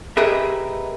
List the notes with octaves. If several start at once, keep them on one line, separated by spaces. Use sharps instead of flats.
G4 G#4 A#4 B4 D#5 E5